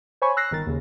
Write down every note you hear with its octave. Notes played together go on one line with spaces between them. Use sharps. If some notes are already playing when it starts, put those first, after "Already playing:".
C5 C#5 G#5 B5 C#6
E6 F#6 A#6 C7
G1 D#3 A#4 A6
D#2 C#3